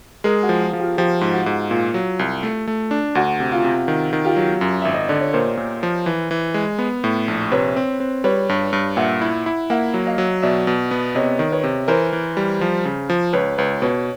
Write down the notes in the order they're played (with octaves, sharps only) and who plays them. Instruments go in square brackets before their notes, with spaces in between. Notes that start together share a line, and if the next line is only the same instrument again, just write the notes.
[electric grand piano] G#3 [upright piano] G#4 A#4
[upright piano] F#4
[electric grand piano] F3
[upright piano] F4
[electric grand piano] F3
[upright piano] F4 G4
[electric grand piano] F3 [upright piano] F4 G4
[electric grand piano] G#2 [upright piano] F4
[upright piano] F#4
[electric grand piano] G#2
[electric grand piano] A#2 [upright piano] F4
[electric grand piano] F#3
C2
A3
A3
D4
[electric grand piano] D2 [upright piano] F#4
[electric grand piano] C3
[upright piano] F4
[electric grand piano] C3
D#3
D#3
[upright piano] F4 G4
[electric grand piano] F#3
F#2
[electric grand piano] G#1 [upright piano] E5
[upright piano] D#5
[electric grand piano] D3 [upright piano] D5
[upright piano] C#5
[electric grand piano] A#2 [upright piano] A#4 C5
[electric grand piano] A#2
F3
E3
E3
G#3
B3
A2
A#1
[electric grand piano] C3 [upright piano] B4 C#5
[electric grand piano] C4
C4
[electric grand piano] G3 [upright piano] B4 C#5
[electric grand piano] G2
G2
[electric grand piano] A#2 [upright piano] E5 F#5
[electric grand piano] E4
E4
[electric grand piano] A#3 [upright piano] E5 F#5
[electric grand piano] F#3
[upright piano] D#5 F5
[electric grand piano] F#3
[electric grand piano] B2 [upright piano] D5 E5
[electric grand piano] B2
B3
[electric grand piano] C3 [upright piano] C#5 D#5
[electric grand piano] D#3
[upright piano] B4 C#5
[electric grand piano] C3
[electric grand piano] E3 [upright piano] A#4 C5
[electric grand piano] E3
G3
F3
C#3
F3
[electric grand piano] C#2 [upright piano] B4 C#5
[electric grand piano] C#2 [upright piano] B4 C#5
[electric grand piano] B2 [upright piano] B4 C#5